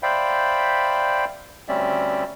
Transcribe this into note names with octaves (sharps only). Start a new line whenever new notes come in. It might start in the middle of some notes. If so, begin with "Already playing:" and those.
C5 D5 E5 F5 G5 B5
D2 G3 C4 C#4 D5 E5